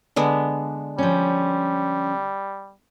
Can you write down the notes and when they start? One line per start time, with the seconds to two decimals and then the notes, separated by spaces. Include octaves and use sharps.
0.16 D3 G#3 B3
0.99 F3 G3 C#4